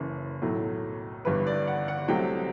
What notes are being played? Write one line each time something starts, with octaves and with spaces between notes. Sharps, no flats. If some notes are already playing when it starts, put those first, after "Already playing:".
Already playing: F#1 F#2 E3
B1 A2 F#3 A3
G1 G2 E3 B4
D5
F#5
F#5
C2 C3 F#3 A3 G5